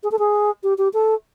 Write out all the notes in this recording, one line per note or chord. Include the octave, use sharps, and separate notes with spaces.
G#4
A4
G#4
G4
G4
A4